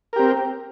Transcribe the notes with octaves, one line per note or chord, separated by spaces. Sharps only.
C4 G4 A#4